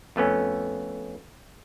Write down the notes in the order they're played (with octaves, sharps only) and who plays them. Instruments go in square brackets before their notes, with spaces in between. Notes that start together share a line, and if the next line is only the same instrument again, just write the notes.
[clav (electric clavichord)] F2 A3 B3 C#4